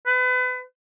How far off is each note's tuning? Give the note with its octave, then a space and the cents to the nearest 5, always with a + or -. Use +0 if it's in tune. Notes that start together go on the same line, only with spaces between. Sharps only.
B4 +30